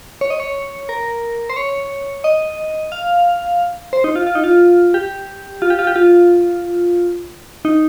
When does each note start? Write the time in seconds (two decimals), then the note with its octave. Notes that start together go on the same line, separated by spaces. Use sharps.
0.21 C#5
0.30 D#5
0.40 C#5
0.89 A#4
1.50 C5
1.56 C#5
2.24 D#5
2.92 F5
3.93 C5
4.04 D#4
4.16 F4
4.27 F4
4.35 D#4
4.44 F4
4.94 G4
5.62 F4
5.70 G4
5.79 F4
5.87 G4
5.96 F4
7.65 D#4